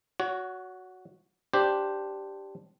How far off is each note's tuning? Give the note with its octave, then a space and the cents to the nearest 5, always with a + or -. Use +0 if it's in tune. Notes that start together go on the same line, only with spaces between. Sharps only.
F#4 +0 C#5 +30
D4 +0 G4 +0 C5 +0